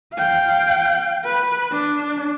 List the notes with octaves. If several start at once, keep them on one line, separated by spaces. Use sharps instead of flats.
F5 G5
B4
D4